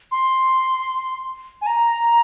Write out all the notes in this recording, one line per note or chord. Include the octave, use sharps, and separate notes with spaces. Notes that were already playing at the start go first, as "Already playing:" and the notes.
C6
G#5
A#5